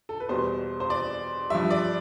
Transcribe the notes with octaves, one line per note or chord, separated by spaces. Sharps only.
A4
B4
E2 B2 G3 C5
C5
D5
G2 F3 E5
D5